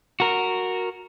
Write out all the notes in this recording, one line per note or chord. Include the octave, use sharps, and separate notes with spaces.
F#4 A#4